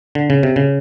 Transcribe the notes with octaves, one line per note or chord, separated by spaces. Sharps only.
D3
C#3
C3
C#3